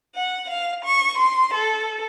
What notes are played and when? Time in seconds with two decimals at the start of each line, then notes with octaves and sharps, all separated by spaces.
0.16 F#5
0.50 F5
0.86 C#6
1.19 C6
1.54 A4